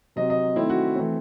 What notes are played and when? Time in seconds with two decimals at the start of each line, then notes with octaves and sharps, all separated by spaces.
0.16 C3 F#3 C4 D#5
0.30 D#5
0.56 D#3 A3 C4 E4
0.70 F#4
0.96 E3 A3 C4